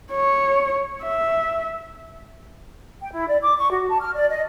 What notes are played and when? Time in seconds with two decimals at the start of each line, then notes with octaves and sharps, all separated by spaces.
0.12 C#5
1.03 E5
3.01 G5
3.13 E4
3.28 D5
3.42 D6
3.56 C#6
3.71 F#4
3.89 A5
4.00 F6
4.14 D5
4.29 D#5